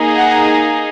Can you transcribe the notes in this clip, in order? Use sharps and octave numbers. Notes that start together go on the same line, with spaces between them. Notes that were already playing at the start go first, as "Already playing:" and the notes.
Already playing: A#3 D#4 G#4
F#5